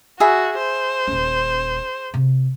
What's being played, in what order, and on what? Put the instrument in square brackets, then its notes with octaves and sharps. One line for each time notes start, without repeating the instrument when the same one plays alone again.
[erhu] F#4 [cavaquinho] G#4 E5 B5
[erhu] C5
[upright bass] D#1 C#4
C3